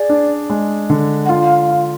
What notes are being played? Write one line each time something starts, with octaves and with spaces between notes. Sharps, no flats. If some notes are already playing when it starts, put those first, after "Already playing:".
Already playing: G#4 D5
D4
G#3
D3
F#5
F4 F5
F4